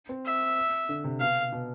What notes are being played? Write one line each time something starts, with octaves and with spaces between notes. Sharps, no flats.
C4
E5
D3
C3
B2 F5
B2